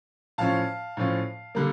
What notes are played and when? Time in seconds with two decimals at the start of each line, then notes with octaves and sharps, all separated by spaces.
0.38 A2 F3 C#4 F4 F5 A5
0.97 A2 F3 C#4 F4
1.55 D3 G3 A#3